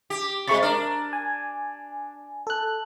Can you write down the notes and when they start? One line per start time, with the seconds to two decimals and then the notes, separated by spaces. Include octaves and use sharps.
0.10 G4
0.47 C3 G#3 C#6 A6
0.63 D4 A#4
1.13 G#5
2.47 A4 F#6